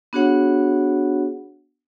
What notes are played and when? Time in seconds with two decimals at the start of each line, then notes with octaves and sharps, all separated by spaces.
0.13 B3 D4 F#4 G#4 C#5 F#5